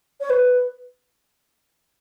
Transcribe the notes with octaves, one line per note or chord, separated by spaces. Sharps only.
C#5
B4